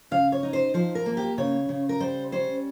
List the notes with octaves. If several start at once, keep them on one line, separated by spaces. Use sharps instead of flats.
C#3 F5
C#5
D#4
C5
F3 C5
A#4
A#3
G4
C#3 C#5
C#3
A#4
G3 C5
C#4 C5